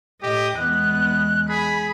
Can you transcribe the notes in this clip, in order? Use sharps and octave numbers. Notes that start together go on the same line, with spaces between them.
A2 G4 D#5
E2 G#3 B3 F#6
G#4 B5